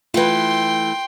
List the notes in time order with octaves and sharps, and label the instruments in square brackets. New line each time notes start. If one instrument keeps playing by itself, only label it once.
[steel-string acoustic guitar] E3 A3 [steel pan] F4 B4 [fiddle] G5 C6